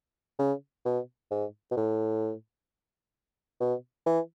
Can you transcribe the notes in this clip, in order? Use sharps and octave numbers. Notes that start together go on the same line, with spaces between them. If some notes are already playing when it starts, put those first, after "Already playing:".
C#3
B2
G#2
B2
A2
B2
E3